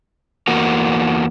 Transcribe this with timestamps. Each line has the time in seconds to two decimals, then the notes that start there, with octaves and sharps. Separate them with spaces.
0.47 E2 A#3 F#4